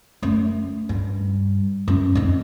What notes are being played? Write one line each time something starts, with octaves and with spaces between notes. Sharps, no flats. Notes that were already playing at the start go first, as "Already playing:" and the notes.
F#2 A3
G2
F#2
F2 D#4